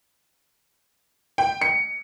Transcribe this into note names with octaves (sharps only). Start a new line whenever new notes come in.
G5
C#7